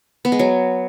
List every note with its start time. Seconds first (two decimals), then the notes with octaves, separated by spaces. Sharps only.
0.25 B3
0.32 G#3
0.39 F#3